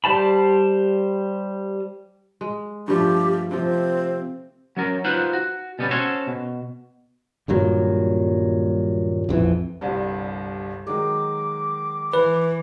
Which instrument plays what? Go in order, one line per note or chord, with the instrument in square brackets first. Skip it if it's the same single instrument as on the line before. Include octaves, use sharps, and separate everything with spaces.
[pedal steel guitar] G3 C5 A5 B5
[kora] G#3
[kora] G2 F3 A3 [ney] G4
[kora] C3 F3 [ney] C4
[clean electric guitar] F#3 C#4 A#4
D#4 F4 B4 C5 F#5
F#4
B2 G3 B3 C#4
C#4 F#4 A4 C5 C#5
B2
[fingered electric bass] D#1 G2 A#2 F#3
A#1 F2 E3
[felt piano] G1 C2 G2
[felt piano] D#3 F#3 G#3 [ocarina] D6
[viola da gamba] E3 [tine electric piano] B4